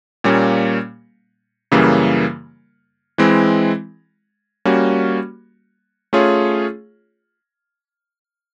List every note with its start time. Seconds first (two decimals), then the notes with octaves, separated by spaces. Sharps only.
0.24 A#2 G3 A#3 C#4
1.72 F#2 C#3 E3 G3 A#3
3.18 E3 G#3 C4 E4
4.65 G3 A#3 C#4 F#4
6.13 A3 C#4 F4 G#4 C#5